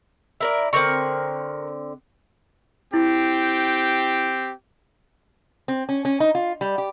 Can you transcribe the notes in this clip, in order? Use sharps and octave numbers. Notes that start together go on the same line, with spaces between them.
E4 A#4 D5
D3 C4 A#4 C#6
C4 E4 G4
C4
C#4
C#4
D#4
F4
G3
G4